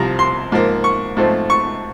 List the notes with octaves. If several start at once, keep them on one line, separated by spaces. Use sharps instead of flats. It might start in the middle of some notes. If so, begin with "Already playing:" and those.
Already playing: C2 C3 F3 A#5
C6
G#2 F3 A#3
C#6
G#2 F3 A3 C4
C#6